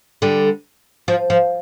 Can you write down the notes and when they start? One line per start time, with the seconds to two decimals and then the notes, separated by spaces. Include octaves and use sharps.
0.22 D3 G3
1.08 F3
1.30 F3